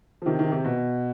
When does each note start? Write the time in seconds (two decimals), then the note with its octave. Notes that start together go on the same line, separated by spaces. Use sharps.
0.22 F3
0.26 C3 D#3
0.39 C3 D#3
0.52 C3
0.65 B2